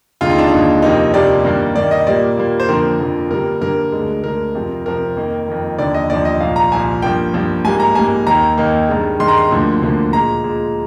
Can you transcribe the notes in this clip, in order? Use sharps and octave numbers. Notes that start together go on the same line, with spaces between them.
D#2 D3 G#3 F4
D#4
D4
D#4
D#2 D3 G#3
F2 C3 G3 A#3 D#4
F2 C3 G3 A#3 D5
G2 D#3 A#3
G2 D#3 A#3 D5
D#5
A#2 G3 A#3 D5
A#2 G3 A#3
C5
F2 D3 F3 A#3 A#4
F2 D3 F3 A#3
G2 D3 G3 A#3 A#4
G2 D3 G3 A#3 A#4
D2 D3 G#3
D2 D3 G#3 A#4
F2 C3 F3
F2 C3 F3 A#4
F2 D#3 A#3
F2 D#3 A#3
D#2 D3 F3 D5
D#5
D#2 D3 F3 D5
D#5
C2 A#2 F3 F5
A#5
C2 A#2 F3 G#5
G2 F3 A#3 G5
G2 F3 A#3
G#2 G3 A#3 G#5
A#5
G#2 G3 A#3 G#5
D#2 D#3 A#3 A#5
D#2 D#3 A#3
G2 D#3 G#3
G2 D#3 G#3 C6
A#5
C6
D2 D3 F3 A#3
D2 D3 F3 A#3
A#2 G#3 A#5
A#2 G#3